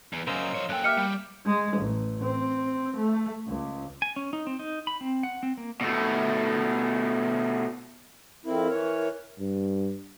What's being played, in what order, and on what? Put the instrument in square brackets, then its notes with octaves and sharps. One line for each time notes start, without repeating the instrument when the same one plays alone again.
[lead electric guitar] E2
[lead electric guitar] F#2 C#3 [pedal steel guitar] A#4 C5 D#5 [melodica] F5 E6
[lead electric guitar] F3 C#5
[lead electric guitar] F#2 G5 [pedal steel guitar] A#3 F#6 [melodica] A4
[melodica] G4 G5 [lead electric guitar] D#5 E5 [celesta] F6 C#7
[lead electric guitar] G3
[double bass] G#3
A1
C4
A3
C#2
[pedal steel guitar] G#5
C#4
D#4
C4
D#4
B5
C4
F#5
C4
A#3
[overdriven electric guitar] B2 A3
[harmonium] F2 C4 E4 [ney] A#4
[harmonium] E3 C#5
[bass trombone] G2